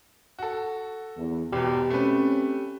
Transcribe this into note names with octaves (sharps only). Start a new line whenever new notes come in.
F#4 A4
E2
G#1 E2 B2 G4
A3 C4 C#4 B4